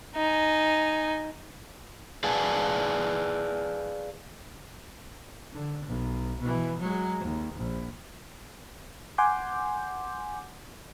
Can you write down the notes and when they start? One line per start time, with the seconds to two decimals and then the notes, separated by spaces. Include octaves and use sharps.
0.16 D#4 G#5
2.24 G#4 B4 D5 F5 G#5 A5
5.53 D3
5.86 B1
6.40 B2 E3
6.79 F#3 G#3
7.24 D#2
7.54 A#1
9.18 F#5 G#5 C6 D6 G6